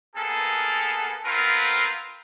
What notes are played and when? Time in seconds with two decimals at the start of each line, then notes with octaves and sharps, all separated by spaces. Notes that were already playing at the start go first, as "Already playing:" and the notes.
0.15 A#3 B3 G#4 A4
1.25 B3 C4 F4 A#4 B4 F5